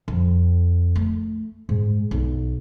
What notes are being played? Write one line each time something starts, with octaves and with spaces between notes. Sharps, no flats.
F2
A3
G#2
B1